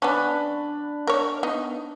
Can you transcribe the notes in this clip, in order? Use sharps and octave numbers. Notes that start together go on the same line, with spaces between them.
B3 C#4 D4 B5
A#4 C#5
B3 D#4